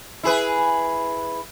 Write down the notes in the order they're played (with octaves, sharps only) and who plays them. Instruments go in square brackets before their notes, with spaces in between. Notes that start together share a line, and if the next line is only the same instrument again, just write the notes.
[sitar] E4 G#4 B4